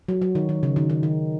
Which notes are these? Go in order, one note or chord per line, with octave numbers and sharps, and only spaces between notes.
F#3
F#3
D#3
D#3
C#3
D#3
D#3
D#3